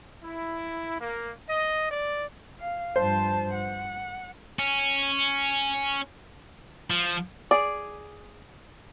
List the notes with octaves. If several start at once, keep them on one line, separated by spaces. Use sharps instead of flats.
E4
A#3
D#5
D5
F5
G2 F3 C5 A5
F#5
C#4
F3
G#4 D5